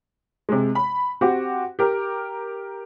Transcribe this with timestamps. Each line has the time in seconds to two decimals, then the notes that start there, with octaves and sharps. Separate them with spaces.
0.49 C3 G#3
0.75 B5
1.21 C4 F#4 G4
1.79 G4 A#4